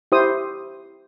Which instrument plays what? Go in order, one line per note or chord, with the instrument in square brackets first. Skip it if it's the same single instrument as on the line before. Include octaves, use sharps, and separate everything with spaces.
[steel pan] E4 G4 C5 D#6